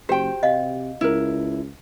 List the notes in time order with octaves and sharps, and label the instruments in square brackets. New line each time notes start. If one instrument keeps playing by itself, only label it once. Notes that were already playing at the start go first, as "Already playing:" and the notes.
[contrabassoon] F#1 [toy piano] F#4 G4 [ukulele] C5 G5
[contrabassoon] C3 [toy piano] D#5 F5
[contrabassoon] C#2 [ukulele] E4 A#4